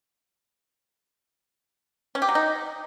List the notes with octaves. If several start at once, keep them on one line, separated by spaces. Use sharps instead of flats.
C#4
G4
F#3
D#4